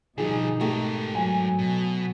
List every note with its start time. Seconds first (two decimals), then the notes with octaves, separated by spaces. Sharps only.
0.18 B2 D3 F3 G3 D#4 G#4
0.61 G#2 A3 G4 A#4
1.15 F#3 G#5
1.59 B2